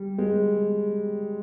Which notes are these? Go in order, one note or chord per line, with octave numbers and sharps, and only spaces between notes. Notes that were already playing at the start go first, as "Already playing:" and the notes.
Already playing: G3
G#3